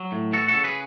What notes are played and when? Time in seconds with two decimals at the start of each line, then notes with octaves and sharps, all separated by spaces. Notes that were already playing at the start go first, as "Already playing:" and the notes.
Already playing: F#3
0.12 A2
0.33 E3 F#4 A4
0.48 F#4 A4
0.55 C#3
0.64 G#4 B4